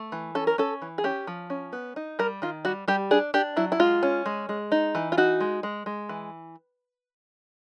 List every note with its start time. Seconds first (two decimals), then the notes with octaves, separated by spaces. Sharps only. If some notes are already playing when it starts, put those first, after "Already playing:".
Already playing: A3
0.12 E3
0.35 C#4 A4
0.47 A#4
0.58 C#4 A4
0.82 E3
0.98 G#4
1.04 C#4 G4
1.27 F3
1.50 C#4
1.73 B3
1.96 D#4
2.19 G3 A#4
2.42 D#3 F4
2.65 G3 F#4
2.88 G3 G4
3.11 D4 G#4
3.34 D4 G4
3.57 F#3 E4
3.72 E4
3.80 G#3 F4
4.03 C#4
4.26 G#3
4.49 G#3
4.72 D#4
4.95 E3
5.12 F4
5.18 D#4 F#4
5.40 G#3
5.63 G#3
5.86 G#3
6.09 E3